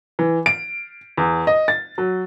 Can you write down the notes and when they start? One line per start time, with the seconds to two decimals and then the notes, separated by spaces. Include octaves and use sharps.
0.19 E3
0.46 D7
1.17 E2
1.47 D#5
1.68 A6
1.98 F#3